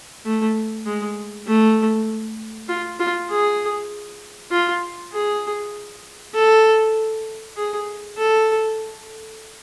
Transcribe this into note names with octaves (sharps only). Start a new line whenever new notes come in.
A3
G#3
A3
F4
F4
G#4
F4
G#4
A4
G#4
A4